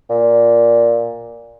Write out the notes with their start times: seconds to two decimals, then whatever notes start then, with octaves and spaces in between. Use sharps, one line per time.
0.10 A#2